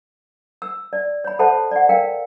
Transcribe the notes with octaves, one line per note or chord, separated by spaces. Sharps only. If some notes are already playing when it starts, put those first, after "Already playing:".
E6
D5
C#5 B5
A4 C5 E5 F#5 A5 B5
D5 F#5
A#4 F5 G5